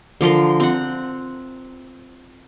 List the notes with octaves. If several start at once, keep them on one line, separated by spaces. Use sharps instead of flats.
D3 F3 A#4 C6
C4 F#5